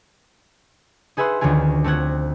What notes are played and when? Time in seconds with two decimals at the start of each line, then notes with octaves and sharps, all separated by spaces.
1.17 D#4 G#4 B4 E5 F#5 C6
1.41 D2 D#3 C#4 F4 G#4
1.84 A3 C4 F4 F#5 G#6